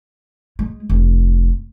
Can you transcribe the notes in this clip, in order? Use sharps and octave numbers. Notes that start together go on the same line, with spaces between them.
G#3
F1